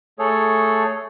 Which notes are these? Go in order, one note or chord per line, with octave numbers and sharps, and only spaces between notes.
A3 G#4 A4 C#5